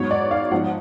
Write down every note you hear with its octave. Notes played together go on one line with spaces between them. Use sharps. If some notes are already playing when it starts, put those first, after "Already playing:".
Already playing: G#2 F#3 B3 C#5
D5
F5
G#2 F3 B3 F#5